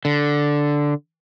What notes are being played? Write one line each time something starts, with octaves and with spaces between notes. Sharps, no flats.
D3